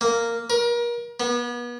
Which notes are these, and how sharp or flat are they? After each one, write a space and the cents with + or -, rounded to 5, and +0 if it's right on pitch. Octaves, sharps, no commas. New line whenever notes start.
A#3 -5
A#4 +35
B3 -35